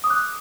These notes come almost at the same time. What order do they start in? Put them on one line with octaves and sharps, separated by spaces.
D#6 D6 F#6